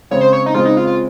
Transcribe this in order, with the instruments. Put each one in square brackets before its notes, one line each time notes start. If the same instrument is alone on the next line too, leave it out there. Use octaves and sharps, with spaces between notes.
[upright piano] C#3 G#3 C4 [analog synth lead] C#5
[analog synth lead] C5
C#5
D#4
[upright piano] C#3 G#3 C4 [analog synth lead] F4
[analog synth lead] D#4
F4
F4